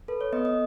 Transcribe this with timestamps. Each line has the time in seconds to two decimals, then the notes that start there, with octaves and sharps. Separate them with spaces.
0.08 A4 B4
0.21 C#5
0.33 B3 D#5
0.45 D#5